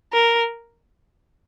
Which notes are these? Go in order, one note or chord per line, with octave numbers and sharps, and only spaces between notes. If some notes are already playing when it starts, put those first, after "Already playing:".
A#4